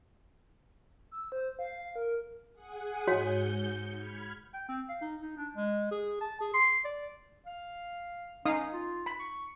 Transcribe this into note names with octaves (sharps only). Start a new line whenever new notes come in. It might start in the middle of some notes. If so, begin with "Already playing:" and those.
E6
C5
F5
A#4
G#4 F#5 G#5
G#2 F#4 C#5 G6 C#7
B5 F6 G#6
G5
C4
F5
D#4
D#4
D4
G#3
G#4
A5
G#4
C6
D5
F5
C#4 D#4 F5 D#6
F4
B5
C#6